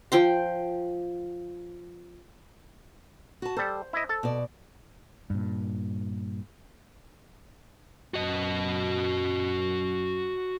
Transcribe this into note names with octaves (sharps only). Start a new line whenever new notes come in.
F3 G5 C6
F#4 A5
G3 A4 C5
E4 D#5
A4 A5
B2 D5
G2 A#2
F#2 F#4 D#5